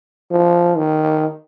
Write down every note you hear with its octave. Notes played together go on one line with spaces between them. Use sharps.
F3
D#3